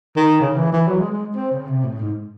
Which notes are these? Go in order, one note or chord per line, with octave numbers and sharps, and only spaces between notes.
D#3
C#3
E3
E3
F#3
G#3
G#3
C4
C#3
C3
A2
G#2